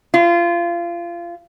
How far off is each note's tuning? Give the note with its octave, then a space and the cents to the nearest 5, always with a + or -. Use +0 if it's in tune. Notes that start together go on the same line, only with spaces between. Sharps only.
F4 -25